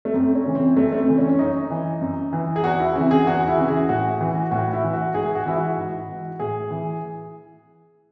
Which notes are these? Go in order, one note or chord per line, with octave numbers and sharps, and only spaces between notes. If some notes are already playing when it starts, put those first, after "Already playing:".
A3
F#2 C4
C#4
C#3 E3
C4
F#2 A3
A3
C4
C#3 E3
C#4
C#4
F#2 D#4
E3
F#2
E3
G#4
E2 F#4
E4
C#3 E3 C4
G#4
E2 F#4
E4
C#3 E3
G#4
A2 F#4
E3
A2 F#4
E4
E3
F#4
G#2 G#4
G#4
F#4
E3 E4
F#4
G#2
E3
A2 G#4
E3